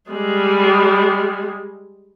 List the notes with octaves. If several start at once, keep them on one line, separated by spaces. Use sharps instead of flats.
G3 G#3